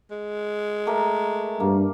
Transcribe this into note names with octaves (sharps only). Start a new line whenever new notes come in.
G#3
A3 G4 A#4
G2 A#3